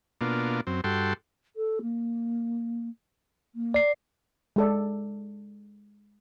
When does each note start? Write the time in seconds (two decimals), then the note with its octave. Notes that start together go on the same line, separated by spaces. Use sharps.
0.21 B2 A#3 D4 F4
0.67 F#2 C4
0.84 G2 F#4 A4 G5 C6
1.56 A4
1.82 A#3
3.55 A#3
3.74 D5 C7
4.56 G#3 A4 D5